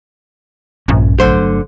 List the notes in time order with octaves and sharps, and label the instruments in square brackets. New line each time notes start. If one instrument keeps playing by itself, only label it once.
[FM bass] A#1 [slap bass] G2 C#4
[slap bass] G1 F#3 A3 [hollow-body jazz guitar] D3 C5